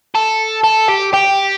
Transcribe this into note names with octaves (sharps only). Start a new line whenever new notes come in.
A4
A4
G4
G4